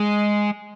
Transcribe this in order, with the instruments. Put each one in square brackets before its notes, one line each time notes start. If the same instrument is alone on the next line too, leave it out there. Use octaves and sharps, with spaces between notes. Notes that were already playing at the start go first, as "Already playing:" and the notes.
Already playing: [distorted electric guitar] G#3